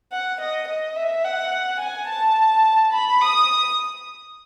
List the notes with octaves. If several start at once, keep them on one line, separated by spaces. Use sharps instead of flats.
F#5
D#5
D#5
E5
F#5
G#5
A5
B5
D#6